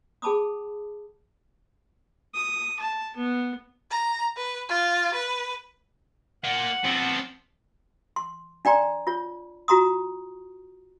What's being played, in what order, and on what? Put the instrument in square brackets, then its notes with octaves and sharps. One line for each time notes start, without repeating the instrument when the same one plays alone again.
[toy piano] G#4 G5 A5 B5 D6 D#6
[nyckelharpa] D#6
A5
B3
[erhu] A#5
B4
F4
B4
[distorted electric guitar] A#3 F4 [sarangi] F#5
[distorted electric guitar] F3 B3 [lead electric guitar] C4
[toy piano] C6
D4 D5 G5 A#5 C6
F4 C#5
F4 F#4 A#5 C6 D#6